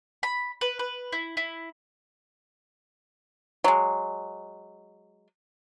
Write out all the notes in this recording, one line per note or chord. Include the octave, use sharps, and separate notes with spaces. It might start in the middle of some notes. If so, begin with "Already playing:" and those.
B5
B4
B4
E4
E4
F#3 G#3